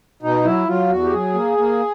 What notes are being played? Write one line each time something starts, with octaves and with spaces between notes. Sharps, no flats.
B2 D#4
F#3 E4
F#3 F4
E2 F#4
G4
F#3 G#4
A#3
A#3